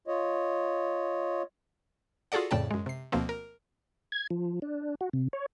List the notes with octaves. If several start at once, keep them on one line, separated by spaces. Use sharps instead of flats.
F4 C#5 D#5
F4 F#4 G#4 A4 D5 F#5
F2 A2 C#3 D5 G5 A5
F#2 G#3
C3 C7
D2 B2 F3 A#3 C4
A#4
G#6
F3
D4
F#4
C3
C#5